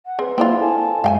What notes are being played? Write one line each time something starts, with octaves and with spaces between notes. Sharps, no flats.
F#5
C4 G#4 B4
A#3 C4 D4 E4 F4
A4 G#5 A5
F#2 G#3 E5 F5 G5 G#5